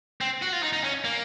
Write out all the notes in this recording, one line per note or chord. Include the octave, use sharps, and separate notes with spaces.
C4
F#4
F4
D#4
D#4
C#4
A#3